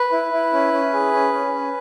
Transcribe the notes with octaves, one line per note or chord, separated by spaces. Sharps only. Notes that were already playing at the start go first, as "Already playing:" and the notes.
Already playing: B4
E4
E4
C#4
C#4
G#4
C#4
C#4
C#4